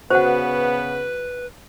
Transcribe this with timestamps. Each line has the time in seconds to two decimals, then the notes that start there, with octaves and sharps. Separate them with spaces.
0.10 C#3 B3 F#4 B4 C5 F#5